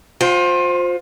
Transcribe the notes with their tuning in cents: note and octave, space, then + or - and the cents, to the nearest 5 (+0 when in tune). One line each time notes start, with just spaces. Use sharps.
F4 +30 C5 +0 G5 +0